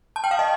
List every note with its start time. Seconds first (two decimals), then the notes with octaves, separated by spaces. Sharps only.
0.16 A5
0.24 G5
0.31 F5
0.39 D#5